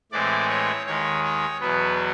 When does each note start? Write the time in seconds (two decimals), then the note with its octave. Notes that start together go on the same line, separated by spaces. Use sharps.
0.12 A2 E3 G#3 C4 D5
0.49 C#5
0.86 D#2 D#3 G#3 C#5
1.24 C#5
1.60 E2 B2 F#3 B3 B4